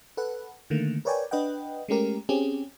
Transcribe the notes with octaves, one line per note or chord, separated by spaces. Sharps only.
A4 B4 F#5
D3 D#3 A3 A#3
A#4 B4 C#5 D5 G5 G#5
D4 B4 D#5 F#5 G5
G#3 A3 C#4 G4 A#4
C4 C#4 G4 G#4